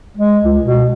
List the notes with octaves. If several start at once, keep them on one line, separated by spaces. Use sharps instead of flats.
G#3
C#2
B2